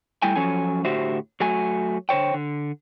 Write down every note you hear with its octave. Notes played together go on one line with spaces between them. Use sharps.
G3 A3 E4 G5 G#5
F3 F#3 C#4 A4 G#5
A2 D3 F#4 G4 C5 E5
F#3 A3 F#4 G#5
D3 C5 C#5 G5
D3